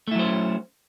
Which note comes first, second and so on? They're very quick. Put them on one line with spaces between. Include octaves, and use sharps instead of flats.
A3 E4 F#3 C5 C#4